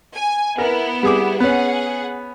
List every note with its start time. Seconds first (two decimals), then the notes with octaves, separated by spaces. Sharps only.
0.14 G#5
0.58 B3 E4 A#4
1.03 G3 G#4 D6
1.40 B3 C#4 G#4 F#5